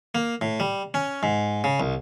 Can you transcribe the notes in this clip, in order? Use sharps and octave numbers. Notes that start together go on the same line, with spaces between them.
A#3
A2
G3
C#4
G#2
C#3
C2